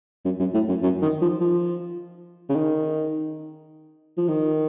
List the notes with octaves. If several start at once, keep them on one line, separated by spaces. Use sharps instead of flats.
F#2
F#2
A2
F#2
F#2
D#3
F3
F3
C#3
D#3
F3
D#3